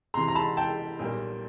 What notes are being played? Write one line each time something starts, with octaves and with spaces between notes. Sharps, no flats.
C#2 C3 E3 A#5 C6
A#5
A5 B5
G5 A5
B1 A#2 G3 A#3